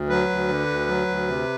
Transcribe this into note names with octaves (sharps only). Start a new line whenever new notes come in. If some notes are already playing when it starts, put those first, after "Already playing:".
Already playing: D2
F#3 B4
D2
D3
D2
F#3
D2
C3